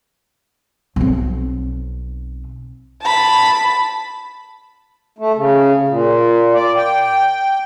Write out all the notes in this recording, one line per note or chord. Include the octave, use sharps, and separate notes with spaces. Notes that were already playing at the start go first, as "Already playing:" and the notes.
B1 C4
A5 B5
A3
C#3
A#2
D5
G5